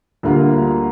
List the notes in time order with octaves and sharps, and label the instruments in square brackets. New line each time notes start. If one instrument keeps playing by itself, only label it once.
[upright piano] D2 D3 G3 A#3 F4